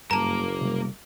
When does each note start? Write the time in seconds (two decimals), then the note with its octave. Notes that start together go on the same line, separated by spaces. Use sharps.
0.11 F#1 G2 A#3 A#4 A5 A#5
0.61 C3 G3